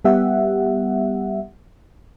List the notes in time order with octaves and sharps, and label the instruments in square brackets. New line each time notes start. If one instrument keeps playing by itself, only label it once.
[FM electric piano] G3 B3 G4 E5 F#5